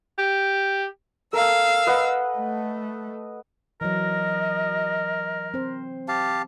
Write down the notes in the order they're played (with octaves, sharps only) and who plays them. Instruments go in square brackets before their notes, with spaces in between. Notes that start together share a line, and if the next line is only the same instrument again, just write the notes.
[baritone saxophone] G4
[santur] A4 A#4 [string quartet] F5 E6
[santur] B4 D#5 F#5
[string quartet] A3
[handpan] E3 F#3 [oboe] A#4 [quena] D#5
[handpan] C4 C5
[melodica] G4 F5 A5